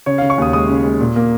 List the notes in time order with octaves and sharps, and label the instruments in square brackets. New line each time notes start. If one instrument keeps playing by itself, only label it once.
[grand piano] C#3 C#5
C#3 F5
C#6
D#2 D#6
G#3 D#6
C#3
G#3
A#2
A#3